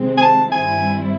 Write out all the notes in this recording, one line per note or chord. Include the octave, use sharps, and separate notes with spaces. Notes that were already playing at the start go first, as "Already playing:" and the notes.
Already playing: C3 D#3 G#3 C4
G#5
A5
G2 D#3 G3 C4 E4 G#5